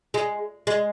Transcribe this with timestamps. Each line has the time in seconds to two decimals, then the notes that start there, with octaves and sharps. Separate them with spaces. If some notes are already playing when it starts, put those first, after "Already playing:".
0.14 G#3
0.67 G#3